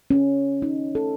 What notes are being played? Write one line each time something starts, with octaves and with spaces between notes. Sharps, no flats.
C#4
D#4
A4